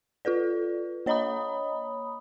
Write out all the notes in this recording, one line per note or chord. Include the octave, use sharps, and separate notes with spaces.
F4 A4 B4 D5
A#3 C#5 D#5 A#5 B5 D#6